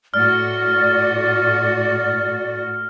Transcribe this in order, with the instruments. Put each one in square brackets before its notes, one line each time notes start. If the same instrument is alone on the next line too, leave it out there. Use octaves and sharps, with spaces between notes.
[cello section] A2 F#4 [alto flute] D5 [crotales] F6